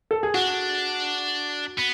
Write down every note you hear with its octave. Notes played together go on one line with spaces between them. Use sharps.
A4
G#4
D4 F#4
B3